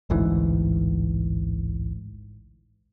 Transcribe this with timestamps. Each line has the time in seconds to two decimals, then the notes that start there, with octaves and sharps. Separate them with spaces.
0.10 A1 D2 G#2 E3